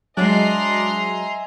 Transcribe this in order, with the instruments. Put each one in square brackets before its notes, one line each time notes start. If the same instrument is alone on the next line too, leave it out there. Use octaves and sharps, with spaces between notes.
[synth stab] F#3 G#3 [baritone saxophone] D4 [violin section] D#5 A#5 C6 [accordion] E5 G#5